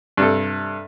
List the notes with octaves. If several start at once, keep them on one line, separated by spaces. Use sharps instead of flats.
G2 C3 A4